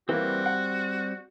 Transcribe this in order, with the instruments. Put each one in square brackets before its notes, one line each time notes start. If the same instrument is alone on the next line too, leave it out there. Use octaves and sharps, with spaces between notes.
[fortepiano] E3 A#3 [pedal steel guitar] G3 C4 [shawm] F#4
[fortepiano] F#5